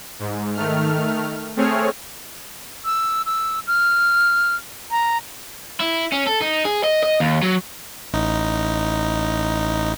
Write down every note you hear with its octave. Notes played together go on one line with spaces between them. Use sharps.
G#2
D#3 A3 F6
A3 C4 G#4 C#5 F6
E6
E6
F6
A#5
E4
C#4
A4
D#4
G#4
D#5
D#5
D#2
F#3
A1 D#4